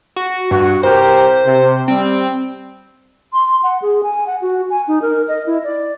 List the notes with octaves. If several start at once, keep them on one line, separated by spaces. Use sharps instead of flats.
F#4
G2 F#4
C2 G4 A#4 C5
C3
G3 C4
C6
F#5
G#4
G#5
F#5
F#4
G#5
D#4
A#4
D#5
E4
D5